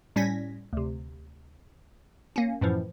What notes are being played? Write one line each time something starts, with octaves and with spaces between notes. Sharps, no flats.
A2 G3 C#4 G#6 A#6 B6
D2 C3
A#3 C#4
F#2 A2 E3 F3